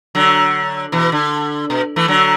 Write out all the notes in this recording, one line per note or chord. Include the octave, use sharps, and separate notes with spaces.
D3 F#3
B2 E3
D3
B2
E3 A3
D3 F#3